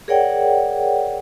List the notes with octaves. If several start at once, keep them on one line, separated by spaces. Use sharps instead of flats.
G#4 A#4 C#5 D5 F#5 G5